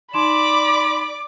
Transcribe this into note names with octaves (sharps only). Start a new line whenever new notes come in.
D#4 D5 B5 C6 D6 E7